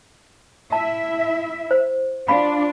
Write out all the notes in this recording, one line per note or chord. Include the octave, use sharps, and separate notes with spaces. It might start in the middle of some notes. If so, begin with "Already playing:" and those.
E4 E5 A5
C5
D4 F4 F5 B5